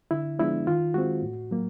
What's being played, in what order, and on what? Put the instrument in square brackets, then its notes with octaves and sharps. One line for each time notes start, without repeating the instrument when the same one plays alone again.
[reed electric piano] D3 E4
F3 G#3 B3 D4 E4
D#3 F4
G#3 C4 F#4
A2
F#3 A#3